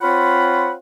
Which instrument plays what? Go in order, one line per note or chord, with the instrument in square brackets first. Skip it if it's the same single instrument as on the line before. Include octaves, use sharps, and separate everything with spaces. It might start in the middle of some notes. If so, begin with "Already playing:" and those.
[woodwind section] C4 F4 C#5 F5 F#5 B5